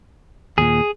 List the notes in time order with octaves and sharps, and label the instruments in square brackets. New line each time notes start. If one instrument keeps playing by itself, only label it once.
[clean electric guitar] D#2 A#2 [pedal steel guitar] G#4